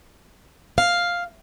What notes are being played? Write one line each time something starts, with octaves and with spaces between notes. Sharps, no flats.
F5